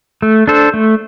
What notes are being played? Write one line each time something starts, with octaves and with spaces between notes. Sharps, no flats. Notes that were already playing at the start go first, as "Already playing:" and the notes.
A3
D4 A4 C5
A3